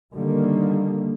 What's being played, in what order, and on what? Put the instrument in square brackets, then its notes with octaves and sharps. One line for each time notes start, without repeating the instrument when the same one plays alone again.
[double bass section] D3 D#3 G3 A#3